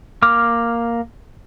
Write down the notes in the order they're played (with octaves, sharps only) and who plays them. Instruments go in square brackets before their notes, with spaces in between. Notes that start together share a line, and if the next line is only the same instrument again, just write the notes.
[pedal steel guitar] A#3 D6 F6